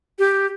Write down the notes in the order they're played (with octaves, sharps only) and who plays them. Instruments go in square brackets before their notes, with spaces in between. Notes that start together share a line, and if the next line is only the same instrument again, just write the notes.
[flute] G4